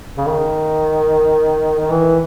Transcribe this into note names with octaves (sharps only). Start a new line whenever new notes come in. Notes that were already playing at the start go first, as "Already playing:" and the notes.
C#3
D#3
D#3
E3